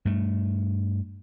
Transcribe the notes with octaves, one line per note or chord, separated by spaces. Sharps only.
G2 A3